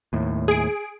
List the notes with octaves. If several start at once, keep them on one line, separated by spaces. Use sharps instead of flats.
D#2 A2
G#4 D7